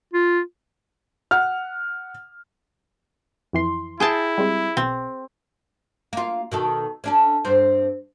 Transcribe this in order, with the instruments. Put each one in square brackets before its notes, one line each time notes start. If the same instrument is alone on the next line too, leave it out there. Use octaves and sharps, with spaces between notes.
[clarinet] F4
[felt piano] F#5 F6
[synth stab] F2 E3 C6
[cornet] E4 [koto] G#4 G5 A5
[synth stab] G3 G#3 C4
[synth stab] B1 [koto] C4
[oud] A#3 F4
B2 D#3 A4
C#4 D4 A4
G2 C4 C5